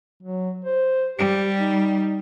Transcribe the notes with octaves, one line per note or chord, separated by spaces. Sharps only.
F#3
C5
G3 G4
D#4